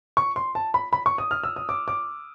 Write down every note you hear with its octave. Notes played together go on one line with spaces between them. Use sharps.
C#6
C6
A5
B5
B5
C#6
D#6
F6
E6
D#6
D6
D6